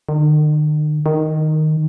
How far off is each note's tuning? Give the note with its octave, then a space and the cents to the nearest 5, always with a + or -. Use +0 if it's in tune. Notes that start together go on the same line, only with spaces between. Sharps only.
D#3 -45
D#3 -5